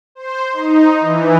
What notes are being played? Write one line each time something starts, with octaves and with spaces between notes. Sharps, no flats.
C5
D#4
E3